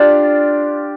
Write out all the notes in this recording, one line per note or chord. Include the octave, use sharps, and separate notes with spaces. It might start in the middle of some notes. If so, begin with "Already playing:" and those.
Already playing: D4 F4 G4